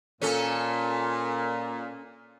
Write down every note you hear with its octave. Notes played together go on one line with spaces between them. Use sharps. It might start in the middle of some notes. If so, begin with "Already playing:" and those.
A#2 C#4 A4